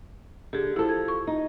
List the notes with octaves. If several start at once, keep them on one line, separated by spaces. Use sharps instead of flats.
D3 G4 G#4
F3 E4 A4
G#6
C#6
D#4